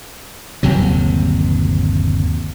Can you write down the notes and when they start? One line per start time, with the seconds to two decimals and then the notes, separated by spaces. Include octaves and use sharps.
0.63 G1 D#2 C3 F#3